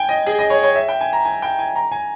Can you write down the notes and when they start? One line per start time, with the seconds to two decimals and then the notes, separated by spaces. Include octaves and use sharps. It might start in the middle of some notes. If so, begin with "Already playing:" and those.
Already playing: G5 G#5
0.09 D#5
0.26 G#4
0.39 D#5
0.50 C#5
0.63 C#5
0.76 E5
0.89 G5
1.01 G#5
1.13 A#5
1.25 G#5
1.42 G5
1.59 G#5
1.76 A#5
1.92 G#5